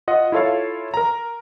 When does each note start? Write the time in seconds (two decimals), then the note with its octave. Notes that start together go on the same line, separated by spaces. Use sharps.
0.08 F4 D#5 F#5
0.32 E4 F4 A4 C#5 F5
0.94 A#4 A#5